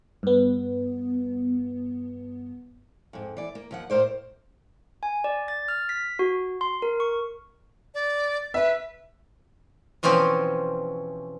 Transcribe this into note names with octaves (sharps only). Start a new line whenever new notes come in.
G2 B3
F2 G#2
E3 D5
A#3
D#2 F3 F#5
A2 A#4 C5 D5
G#5
D5
A6
F6
B6
F#4
C6
A#4
C#6
D5
B4 E5
B2 E3 F3 C4 C#4